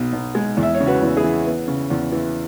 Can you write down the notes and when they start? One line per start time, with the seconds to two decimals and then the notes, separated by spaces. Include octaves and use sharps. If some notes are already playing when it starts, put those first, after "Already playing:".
Already playing: B1 B2
0.13 B1
0.35 G#3
0.57 E2
0.63 E5
0.75 C#5
0.80 C#3
0.87 F#4 B4
1.02 E2
1.16 E4 G#4
1.23 E3
1.47 B3
1.68 C#3
1.90 E2
2.12 E3